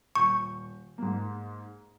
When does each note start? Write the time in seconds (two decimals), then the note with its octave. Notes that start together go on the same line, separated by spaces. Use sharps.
0.15 D#1 C#6 G6
0.98 G#2 A#3